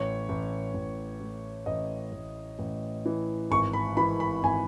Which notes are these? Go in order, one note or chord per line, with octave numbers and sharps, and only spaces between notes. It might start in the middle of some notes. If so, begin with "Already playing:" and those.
Already playing: A1 C#5
A1
A1
A2
A1 D#5
A1
A1
E3
G#1 C#6
B5
E3 B5
B5
G#1 G#5